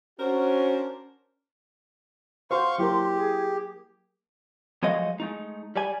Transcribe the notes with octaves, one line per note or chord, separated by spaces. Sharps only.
C#4 D4 F#4 A#4 C5
F#4 C5 F5 C6 C#6
F#3 A#3 E4 G4 A#4
G#4
F3 F#3 G#3 A3 D#5 F5
G#3 A3 D#4
G3 D5 G#5